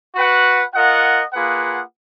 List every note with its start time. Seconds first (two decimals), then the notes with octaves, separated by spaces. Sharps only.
0.15 F#4 B4 F#5
0.74 F4 A#4 D#5 F#5
1.33 A#3 F4 G#4 B4 F#5